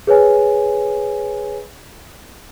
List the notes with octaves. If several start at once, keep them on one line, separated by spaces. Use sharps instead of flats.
G#4 B4 C#5 G#5